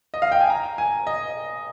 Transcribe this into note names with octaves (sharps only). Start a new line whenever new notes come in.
D#5
F5
G5
G#5
A#5
G#5
D#5